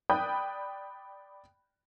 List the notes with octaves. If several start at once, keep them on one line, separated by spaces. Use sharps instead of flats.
D5 G5 B5 D#6 F#6 G6